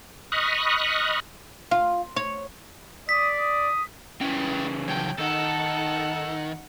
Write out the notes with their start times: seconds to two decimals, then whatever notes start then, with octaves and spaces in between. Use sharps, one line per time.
0.32 D#5 B5 C#6 D#6 F6 F#6
1.71 F4
2.16 C#5
3.09 D5 D#6 B6
3.40 D#6
4.21 C#3 E3 B4 G5
4.88 F3 F#3 G5
5.18 D#3 D#4 A4 F#5